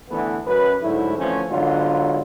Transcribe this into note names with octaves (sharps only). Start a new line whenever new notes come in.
D3 E3 A3 B3
F#2 B4
D2 G#2 F#3 A3 E4
D2 E3 F3 A3 C4 C#4
G#2 D3 F#3 B3 F4